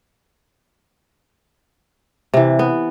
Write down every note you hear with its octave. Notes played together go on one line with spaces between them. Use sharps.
C3 E3
B3